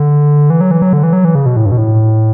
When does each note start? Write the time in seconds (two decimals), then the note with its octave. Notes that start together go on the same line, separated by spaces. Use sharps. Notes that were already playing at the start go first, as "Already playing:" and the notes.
Already playing: D3
0.50 E3
0.61 F#3
0.71 E3
0.82 F#3
0.93 D3
1.03 E3
1.13 F#3
1.25 E3
1.35 C#3
1.46 B2
1.56 A2
1.66 G2
1.72 B2
1.77 A2